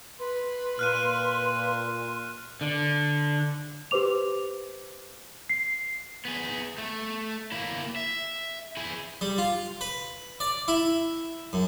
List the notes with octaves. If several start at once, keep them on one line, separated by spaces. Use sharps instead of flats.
B4 C6
A#2 F6 F#6 D#7
D3
G4 B4 C5 D6 F7
C7
B3 G#4
A3
A#3 E4
E5
E4 G#4
G3
F4
B4
D5
E4
F#2